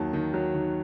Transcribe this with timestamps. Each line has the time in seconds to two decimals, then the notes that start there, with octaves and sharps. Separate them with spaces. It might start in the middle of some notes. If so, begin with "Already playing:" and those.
Already playing: D#2 F#3 A5
0.13 D#3
0.34 F#3
0.55 D#3